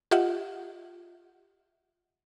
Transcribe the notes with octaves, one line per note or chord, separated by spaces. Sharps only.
F4 G4 D#5 E5 F#5